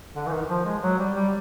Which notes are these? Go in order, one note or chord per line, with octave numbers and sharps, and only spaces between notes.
D3
E3
D#3
F3
G#3
F#3
G3
G3